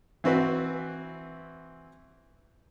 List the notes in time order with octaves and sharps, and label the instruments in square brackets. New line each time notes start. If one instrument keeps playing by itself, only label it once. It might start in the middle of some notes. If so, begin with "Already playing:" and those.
[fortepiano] E3 C4 F#4 B4